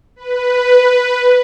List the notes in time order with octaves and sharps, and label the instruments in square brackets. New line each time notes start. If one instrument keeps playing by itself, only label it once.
[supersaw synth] B4